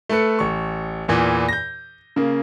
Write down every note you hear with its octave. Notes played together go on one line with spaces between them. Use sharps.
A3 A4 B4 C#7
A1 C#6
E2 A#2 E3
G6 A#6
C#3 A#3